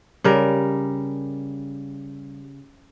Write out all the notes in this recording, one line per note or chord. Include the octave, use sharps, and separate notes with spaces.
C#3 G3 A#4